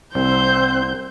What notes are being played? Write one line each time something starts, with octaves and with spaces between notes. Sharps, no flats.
C2 C4 C5 G6